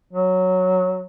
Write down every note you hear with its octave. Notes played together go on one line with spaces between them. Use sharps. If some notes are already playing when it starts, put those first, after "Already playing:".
F#3